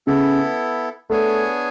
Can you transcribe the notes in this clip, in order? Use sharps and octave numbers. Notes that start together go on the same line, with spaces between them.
C#3 B3 E4 A4
A3 B3 D4 G#4 C#5 G#5